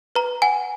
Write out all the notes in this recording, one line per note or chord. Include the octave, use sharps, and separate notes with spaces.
B4 A#5
F#5 G#5